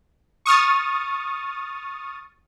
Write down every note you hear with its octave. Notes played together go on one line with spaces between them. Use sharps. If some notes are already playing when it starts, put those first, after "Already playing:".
C#6 D#6 F6 A6